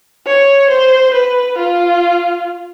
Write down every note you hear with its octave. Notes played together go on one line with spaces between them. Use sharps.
C#5
C5
B4
F4